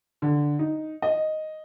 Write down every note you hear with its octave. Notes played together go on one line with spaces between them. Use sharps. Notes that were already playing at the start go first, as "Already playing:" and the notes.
D3
D#4
D#5